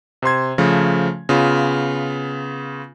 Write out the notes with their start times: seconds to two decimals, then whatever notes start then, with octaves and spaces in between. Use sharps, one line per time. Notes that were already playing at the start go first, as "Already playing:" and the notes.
0.22 C3 C5 C6 G#6
0.58 C#3 F3 A3
1.29 C#3 B3 F4